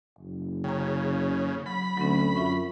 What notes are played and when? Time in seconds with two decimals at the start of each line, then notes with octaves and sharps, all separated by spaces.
0.19 F#1
0.64 C#3 G5 A#5
1.66 F#3 B5
1.97 D2 F#3 C4 C#4
2.35 F#2 F4 E5 C#6